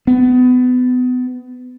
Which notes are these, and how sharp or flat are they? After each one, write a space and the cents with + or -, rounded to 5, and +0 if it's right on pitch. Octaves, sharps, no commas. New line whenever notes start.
B3 +25